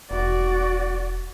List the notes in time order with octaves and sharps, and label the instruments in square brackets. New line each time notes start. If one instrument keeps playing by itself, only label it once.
[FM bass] E1 [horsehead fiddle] F#4 D5